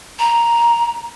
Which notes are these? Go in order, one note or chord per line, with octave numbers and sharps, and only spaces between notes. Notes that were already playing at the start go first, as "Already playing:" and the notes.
A#5